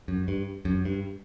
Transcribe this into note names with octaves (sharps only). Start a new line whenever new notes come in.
F#2
G2
F#2
G2